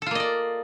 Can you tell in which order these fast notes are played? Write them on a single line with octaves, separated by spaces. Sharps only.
A4 F4 A#3 D#5 D5